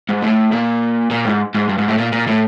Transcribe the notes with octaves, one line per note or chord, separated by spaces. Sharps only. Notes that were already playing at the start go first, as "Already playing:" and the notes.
G#2
A2
A#2
A#2
G#2
G#2
G2
G#2
A2
A#2
A#2
A2